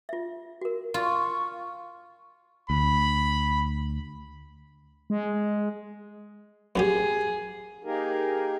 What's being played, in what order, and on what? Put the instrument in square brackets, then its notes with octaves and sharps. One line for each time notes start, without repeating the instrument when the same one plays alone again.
[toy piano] F4 E5
F#4 A#4
[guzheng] F4 [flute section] C#6
[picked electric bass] D2 [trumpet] B5
[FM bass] G#3
[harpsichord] F#2 D3 G4 [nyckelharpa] G#4
[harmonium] A#3 D#4 G4 G#4 A#4